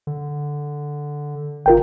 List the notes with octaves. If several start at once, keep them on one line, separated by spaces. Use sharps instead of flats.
D3
G1 F4 A#4 G5